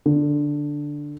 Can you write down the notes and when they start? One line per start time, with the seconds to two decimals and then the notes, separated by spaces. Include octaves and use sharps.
0.06 D3